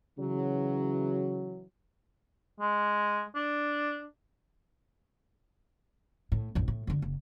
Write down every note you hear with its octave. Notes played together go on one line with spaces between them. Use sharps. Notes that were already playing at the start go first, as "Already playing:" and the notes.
C#3 E3 F#3
G#3
D4
A2
A#1 F#2
A2
F#2 D3
F#1